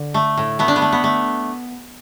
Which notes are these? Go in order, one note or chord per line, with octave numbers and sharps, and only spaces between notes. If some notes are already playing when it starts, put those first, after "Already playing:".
Already playing: D3
A3
A2
A3 B3
D4
B3
A3
B3
A3